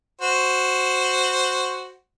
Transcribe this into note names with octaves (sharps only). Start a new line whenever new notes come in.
F#4 C5